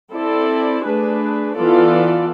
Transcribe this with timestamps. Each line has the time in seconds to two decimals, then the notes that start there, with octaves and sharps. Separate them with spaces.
0.12 C4 E4 A4 D5
0.84 A3 D4 G#4 B4
1.55 E3 B3 F4 A4 D5